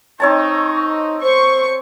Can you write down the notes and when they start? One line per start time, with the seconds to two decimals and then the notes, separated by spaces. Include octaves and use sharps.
0.20 C4 D#4 C#5 A5 C#6
1.22 C5 C#6